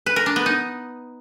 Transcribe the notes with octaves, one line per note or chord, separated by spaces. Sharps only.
B4
A#4
D4
B3
D#4